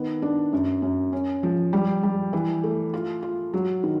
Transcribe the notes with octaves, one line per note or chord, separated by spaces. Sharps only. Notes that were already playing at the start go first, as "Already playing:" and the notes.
Already playing: D#3 B3
D4
F#2
F#2
C#4
F3
G3
G3
E3
A3
F4
F4
F#3
D#3